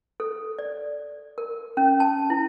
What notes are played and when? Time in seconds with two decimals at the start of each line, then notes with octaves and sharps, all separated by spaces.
0.20 A4
0.59 D5
1.38 A#4
1.77 C#4
2.00 A5
2.30 E4